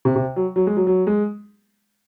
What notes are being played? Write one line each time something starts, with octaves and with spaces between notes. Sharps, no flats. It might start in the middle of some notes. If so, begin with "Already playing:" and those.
C3
C3
F#3
F#3
G#3
F#3
F#3
G#3